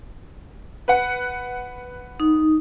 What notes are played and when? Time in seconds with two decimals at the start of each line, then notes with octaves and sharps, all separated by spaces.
0.88 B4 F#5
2.20 D#4